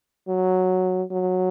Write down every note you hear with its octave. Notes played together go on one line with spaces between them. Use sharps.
F#3
F#3